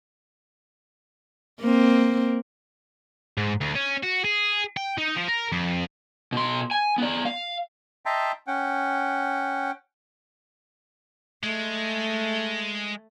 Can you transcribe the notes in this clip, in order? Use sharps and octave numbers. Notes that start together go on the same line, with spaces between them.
A#3 C4
G#2
D2
C#4
F#4
G#4
G5
D#4
F3
A#4
F2
B2 C6
G#5
B3 D5
F5
D#5 E5 G5 A5 A#5 C6
C#4 F#5 G5
G#3 A3